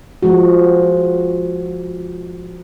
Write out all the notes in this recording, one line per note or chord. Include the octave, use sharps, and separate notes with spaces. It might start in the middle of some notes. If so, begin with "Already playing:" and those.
F3 G#3 F#4